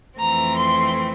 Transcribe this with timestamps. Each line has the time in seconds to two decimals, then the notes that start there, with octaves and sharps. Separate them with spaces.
0.20 F2 E3 A3 C4 A#5
0.57 C6